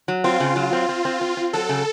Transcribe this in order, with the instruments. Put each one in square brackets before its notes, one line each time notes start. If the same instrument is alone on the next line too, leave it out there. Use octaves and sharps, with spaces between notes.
[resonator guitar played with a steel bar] F#3
[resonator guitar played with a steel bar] C4 [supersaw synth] F4
[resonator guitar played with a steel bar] C#3
F#3
C4
C4
C4
C4
C4
[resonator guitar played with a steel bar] F#3 [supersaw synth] A4
[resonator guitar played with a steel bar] C#3